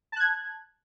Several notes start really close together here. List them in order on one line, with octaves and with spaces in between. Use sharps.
A5 F#6 G#6